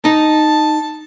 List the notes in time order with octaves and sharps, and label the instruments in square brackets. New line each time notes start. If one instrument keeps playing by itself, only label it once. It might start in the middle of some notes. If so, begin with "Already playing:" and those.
[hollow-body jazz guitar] D#4 [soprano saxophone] A5